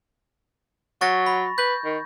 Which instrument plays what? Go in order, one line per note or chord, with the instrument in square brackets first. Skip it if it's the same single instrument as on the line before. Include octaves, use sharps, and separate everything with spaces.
[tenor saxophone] F#3 [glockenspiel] C#6 A6 A#6
[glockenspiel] B5
[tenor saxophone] B4 [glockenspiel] G6
[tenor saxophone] D#3